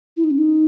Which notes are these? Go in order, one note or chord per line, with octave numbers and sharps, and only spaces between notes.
E4
D#4
C#4
D#4